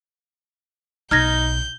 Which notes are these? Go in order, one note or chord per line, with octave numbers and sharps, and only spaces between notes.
B1 D#4 F6 G6 G#6 A#6